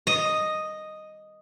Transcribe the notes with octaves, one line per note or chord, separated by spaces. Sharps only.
D#5